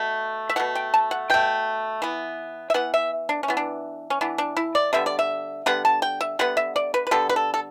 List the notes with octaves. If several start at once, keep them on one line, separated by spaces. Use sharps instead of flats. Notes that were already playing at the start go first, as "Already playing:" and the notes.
Already playing: B2 A3
E5
B2 A3 F#5
G5
A5
F#5
B2 A3 G5
E3 B3
E5
E3 B3 F#5
E5
D4
C#4
E3 B3
D4
C#4
E3 B3 D4
D4
E4
D5
D3 G3 B3 E5
D5
E5
D3 G3 B3 F#5
A5
G5
E5
D3 G3 B3 F#5
E5
D5
B4
B4
D3 G3 B3 A4
B4
A4
A4